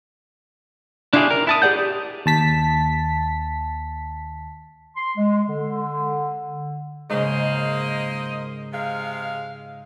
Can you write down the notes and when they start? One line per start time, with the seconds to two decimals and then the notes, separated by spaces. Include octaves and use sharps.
1.13 D4 E4 F4 G4 G#4
1.30 A#4
1.47 E4 A5 D#6
1.62 G4 G#4 D5 F#5 G6
1.76 G4
2.26 D#2 A5 B6
4.96 C6
5.17 G#3
5.48 D3
7.09 G#2 C#3 A#3 C5 D#5
8.72 C3 G#3 F5